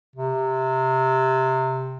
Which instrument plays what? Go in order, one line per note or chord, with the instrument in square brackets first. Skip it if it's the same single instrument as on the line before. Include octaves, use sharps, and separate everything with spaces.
[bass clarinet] C3